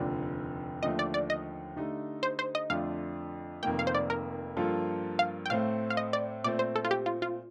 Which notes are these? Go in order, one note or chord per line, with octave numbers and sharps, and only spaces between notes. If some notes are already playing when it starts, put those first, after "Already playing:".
Already playing: F1 D#2 D3 F3 D5
D#2 D3 F3 A3 D#5
D5
D5
D#5
D3 A3 D#4 G4
C5
C5
D#5
F2 D3 A3 D4 F4 F5
F1 F2 D#3 A#3 G5
F5
C5
D5
A#4
G2 F3 A#3 F4 A4
F5
G5
A2 A3 C4 F5
F5
D#5
D5
A#2 A3 C4 D5
C5
A4
F4
G4
F4
F4